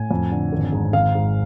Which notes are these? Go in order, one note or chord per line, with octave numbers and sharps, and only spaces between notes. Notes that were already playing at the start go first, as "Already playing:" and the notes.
Already playing: A2 G#5
F2
D3
G#1
G#2
G#1 F5
G#2